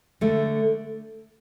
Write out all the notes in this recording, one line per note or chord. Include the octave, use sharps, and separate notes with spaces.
D3 A3